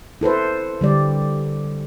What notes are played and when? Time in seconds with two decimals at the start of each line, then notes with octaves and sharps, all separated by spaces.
0.21 E4 A4 B4 C5
0.81 D3 G3 D5